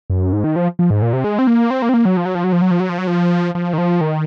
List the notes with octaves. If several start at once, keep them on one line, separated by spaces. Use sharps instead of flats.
F#2
G#2
D#3
F3
F3
G#2
A#2
C3
G#3
C4
A#3
C4
A#3
C4
A#3
F#3
F3
F#3
F3
F#3
F3
F#3
F3
F#3
F3
F#3
F3
F3
D#3
F3
D#3